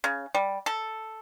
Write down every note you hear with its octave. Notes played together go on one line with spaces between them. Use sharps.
C#3
G3
A4